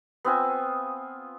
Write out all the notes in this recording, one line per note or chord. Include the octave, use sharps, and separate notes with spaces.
B3 C4 F4 G#5